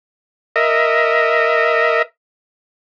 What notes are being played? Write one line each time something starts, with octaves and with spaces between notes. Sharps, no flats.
A#4 D#5 E5